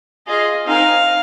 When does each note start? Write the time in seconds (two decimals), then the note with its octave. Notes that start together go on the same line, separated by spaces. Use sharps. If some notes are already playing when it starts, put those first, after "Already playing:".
0.27 F4 G#4 D#5 F5
0.67 C4 D#4 A#4 F5 G#5